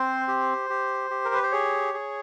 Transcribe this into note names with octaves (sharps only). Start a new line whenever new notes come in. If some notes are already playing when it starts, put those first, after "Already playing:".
Already playing: C4 C5
G4
G4
G4
A#4
B4
C5
G#4 C#5
G#4